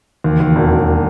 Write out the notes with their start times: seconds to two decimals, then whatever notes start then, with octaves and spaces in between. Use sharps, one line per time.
0.24 D#2
0.40 D#2
0.56 E1
0.71 E1